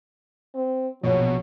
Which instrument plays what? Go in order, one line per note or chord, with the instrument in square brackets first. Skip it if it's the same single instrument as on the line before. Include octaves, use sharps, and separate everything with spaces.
[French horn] C4
[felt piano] A#1 [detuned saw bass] B2 [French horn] F#3 [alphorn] C#5